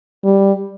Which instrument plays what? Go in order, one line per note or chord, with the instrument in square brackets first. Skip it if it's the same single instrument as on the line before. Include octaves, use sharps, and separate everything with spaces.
[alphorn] G3